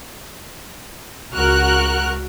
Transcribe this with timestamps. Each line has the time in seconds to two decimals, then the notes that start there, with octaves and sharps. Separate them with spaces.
1.35 C#2 F#4 A#4 F6 F#6